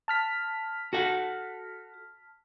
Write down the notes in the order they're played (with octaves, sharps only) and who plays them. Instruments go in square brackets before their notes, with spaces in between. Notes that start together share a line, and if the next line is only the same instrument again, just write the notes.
[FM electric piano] A5 F6 B6
[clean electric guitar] F#4 A4 F#5